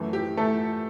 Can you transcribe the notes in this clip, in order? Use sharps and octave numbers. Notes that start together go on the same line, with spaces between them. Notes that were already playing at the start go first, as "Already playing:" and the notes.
Already playing: F#2 E3 A3
G4
A3 A4